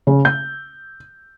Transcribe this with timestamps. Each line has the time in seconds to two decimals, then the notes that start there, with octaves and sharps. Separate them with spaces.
0.07 C#3
0.25 G6